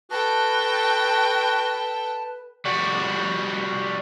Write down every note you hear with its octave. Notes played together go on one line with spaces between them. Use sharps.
F#4 A4 B4 G5 A5
G3 F#4